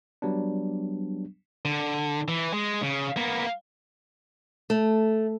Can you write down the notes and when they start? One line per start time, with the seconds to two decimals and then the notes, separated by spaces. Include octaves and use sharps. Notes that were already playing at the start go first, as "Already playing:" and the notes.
0.22 F#3 G3 B3 D4
1.65 D3
2.28 E3
2.54 G#3
2.83 C#3
3.16 A#3 B3
4.70 A3